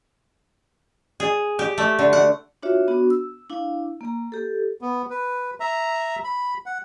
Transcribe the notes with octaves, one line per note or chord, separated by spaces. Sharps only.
G#4
G4
A3
D3
F#5
D4 F4 F#4 C#5 E5
B3 D4 F#4
E6
D4 E4 F5
A#3 A#5
G4 A4
B3
B4
E5 A#5
B5
F#5